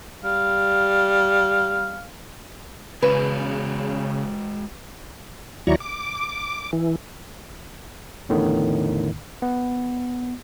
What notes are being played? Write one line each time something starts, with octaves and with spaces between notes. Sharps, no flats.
G3 F5
C#3 G#3 F#4 G#4 B4
D#2 F#3 E4 D5 A#5 C#6
D6
E3
E2 A2 D3 D#3
B3